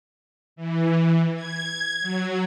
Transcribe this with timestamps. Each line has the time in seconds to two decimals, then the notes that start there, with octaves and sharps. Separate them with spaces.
0.56 E3
1.35 G#6
2.01 F#3